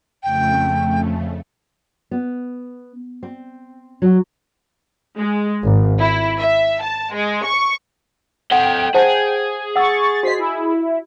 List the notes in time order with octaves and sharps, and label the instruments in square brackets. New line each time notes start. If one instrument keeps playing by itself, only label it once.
[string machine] F2 C#3 A3 [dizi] G5
[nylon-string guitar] B3
C4
F#3
[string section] G#3
G#1
E4
E5
A5
G#3
C#6
[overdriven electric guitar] A4 D#5 [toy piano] F#5 [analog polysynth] G5
[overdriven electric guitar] G#4 [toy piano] C5 F#5 A5
[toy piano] F#5 E6 [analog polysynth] C#6 A6
[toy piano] F#4 D#5 [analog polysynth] C5 B6 C7
[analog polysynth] E4